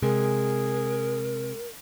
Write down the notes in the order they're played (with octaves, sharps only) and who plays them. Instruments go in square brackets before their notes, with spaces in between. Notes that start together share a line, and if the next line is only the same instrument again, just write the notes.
[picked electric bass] C3 [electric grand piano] G#3 [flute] G#4 [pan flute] A#4